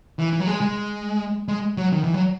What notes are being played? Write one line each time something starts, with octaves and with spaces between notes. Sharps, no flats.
E3
E3
F#3
G#3
G#3
G#3
F#3
D#3
E3
F#3